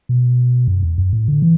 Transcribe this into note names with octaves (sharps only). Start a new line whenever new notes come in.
B2
F#2
E2
F#2
A2
D3
E3